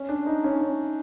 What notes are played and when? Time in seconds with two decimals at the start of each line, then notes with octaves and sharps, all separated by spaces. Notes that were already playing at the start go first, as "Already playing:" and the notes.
Already playing: C#4
0.09 D4
0.26 D#4
0.44 C#4
0.61 C#4